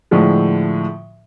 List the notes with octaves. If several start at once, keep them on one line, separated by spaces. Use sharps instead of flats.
A2 D3 F3 G#3